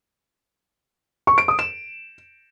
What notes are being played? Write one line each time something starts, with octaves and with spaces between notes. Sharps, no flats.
C#6
D7
D#6
E7